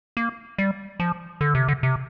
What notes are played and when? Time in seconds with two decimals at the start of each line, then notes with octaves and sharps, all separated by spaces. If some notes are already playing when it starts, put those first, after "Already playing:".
0.17 A#3
0.58 G3
1.00 F3
1.41 D3
1.55 C3
1.68 D3
1.83 C3